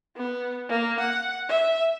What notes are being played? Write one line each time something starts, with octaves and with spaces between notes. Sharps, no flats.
B3
A#3
F#5
E5